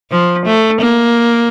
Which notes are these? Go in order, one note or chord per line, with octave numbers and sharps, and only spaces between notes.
F3
A3
A#3